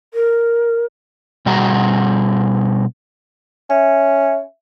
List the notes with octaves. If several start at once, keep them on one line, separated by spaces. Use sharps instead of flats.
A#4
B2 G3 F#4 G#4 A#5
C#4 E5